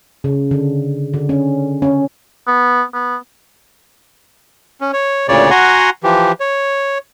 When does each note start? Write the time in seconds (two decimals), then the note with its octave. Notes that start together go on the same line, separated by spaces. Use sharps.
0.24 C#3
0.51 D3
1.14 D3
1.29 C#4
1.82 C#4
2.47 B3
2.94 B3
4.81 C#4
4.93 C#5
5.28 D2 A#2 C#3 C#5 D5
5.51 F#4 F#5 G#5 A#5 C6
6.04 E3 F3 G4
6.40 C#5